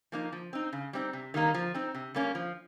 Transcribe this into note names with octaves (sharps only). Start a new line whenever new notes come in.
F3 A#3 D#4
F3
C4 D#4
C#3
G3 C4 D#4
C3
D#3 G3 A#3 D#4
F3
C4 D#4
C3
G3 A#3 C#4
F3